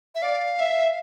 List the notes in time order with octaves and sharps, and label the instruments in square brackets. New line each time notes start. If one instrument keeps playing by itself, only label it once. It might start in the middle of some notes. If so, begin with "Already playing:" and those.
[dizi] E5
[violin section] D5 [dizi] F5
[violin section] E5